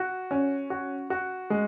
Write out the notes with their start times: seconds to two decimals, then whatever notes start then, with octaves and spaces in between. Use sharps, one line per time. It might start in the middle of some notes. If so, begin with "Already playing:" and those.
Already playing: F#4
0.31 C#4
0.70 F#4
1.10 F#4
1.50 G#3